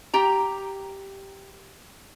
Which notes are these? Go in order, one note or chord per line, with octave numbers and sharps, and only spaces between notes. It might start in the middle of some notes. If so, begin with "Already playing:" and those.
G4 A#5